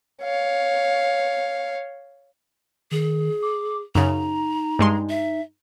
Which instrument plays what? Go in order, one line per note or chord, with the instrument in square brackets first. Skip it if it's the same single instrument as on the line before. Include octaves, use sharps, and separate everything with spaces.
[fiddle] C#5 F5
[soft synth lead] D#3 [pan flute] G#4
[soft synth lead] D6
[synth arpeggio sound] F#2 C#3 [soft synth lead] D#4 [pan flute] A#5
[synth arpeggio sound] G2 G#3 C6
[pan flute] E5